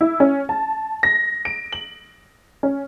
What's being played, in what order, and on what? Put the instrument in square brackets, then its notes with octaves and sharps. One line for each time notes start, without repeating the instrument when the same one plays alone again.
[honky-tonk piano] E4
C#4
A5
A#6
D7
F#7
C#4